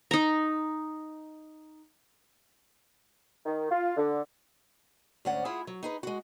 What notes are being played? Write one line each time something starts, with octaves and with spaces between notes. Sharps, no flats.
D#4 A#5
D#3
F4
D3
D2 G#2 C#4 D5 F#5
E4 F4 G#4 F#5
F#3
D#4 G#4 B4
G#3 F#4